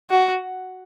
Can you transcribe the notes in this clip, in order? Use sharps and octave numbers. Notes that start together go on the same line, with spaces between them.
F#4